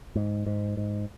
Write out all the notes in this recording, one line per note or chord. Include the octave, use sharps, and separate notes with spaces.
G#2
G#2
G#2